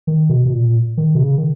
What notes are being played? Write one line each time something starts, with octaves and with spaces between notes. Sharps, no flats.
D#3
B2
B2
A#2
D#3
B2
C#3
D#3